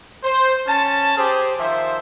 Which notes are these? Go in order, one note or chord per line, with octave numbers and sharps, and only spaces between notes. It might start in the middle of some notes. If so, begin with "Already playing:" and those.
C5
C#4 A5
G4 G#4 C5
D#3 F3 C5 E5